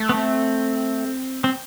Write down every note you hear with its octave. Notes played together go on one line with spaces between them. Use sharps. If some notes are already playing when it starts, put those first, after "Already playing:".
Already playing: A3
B3
C4
C4